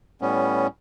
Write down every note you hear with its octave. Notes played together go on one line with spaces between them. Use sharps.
A2 G3 B3 C#4